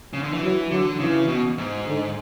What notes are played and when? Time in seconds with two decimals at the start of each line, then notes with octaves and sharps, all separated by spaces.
0.13 C#3
0.23 D3
0.33 E3
0.42 F#3
0.70 D3 F#3
0.99 C#3 E3
1.28 B2
1.58 G#2
1.86 D3